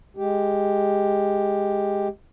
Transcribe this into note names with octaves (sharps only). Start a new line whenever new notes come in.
G#3 G4